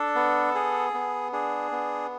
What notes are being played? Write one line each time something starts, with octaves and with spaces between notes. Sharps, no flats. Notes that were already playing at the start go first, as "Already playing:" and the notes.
Already playing: D4 A4
B3
G#4
B3
D4 G#4
B3